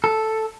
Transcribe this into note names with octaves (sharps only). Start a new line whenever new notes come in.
A4